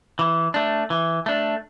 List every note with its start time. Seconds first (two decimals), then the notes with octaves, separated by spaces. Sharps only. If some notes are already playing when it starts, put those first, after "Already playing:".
0.19 E3
0.54 A3 D4
0.90 E3
1.26 A3 D4